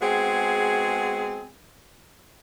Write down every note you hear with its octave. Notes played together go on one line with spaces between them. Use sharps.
G#3 B3 C4 F#4 G#4